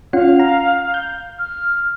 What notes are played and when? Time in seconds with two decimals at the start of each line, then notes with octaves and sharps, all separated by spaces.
0.13 C#4 F4 F5 F#5
0.40 A#5
0.94 G6
1.39 F6